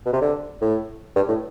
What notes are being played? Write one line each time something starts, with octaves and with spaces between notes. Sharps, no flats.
B2
C3
D3
A2
G2
A2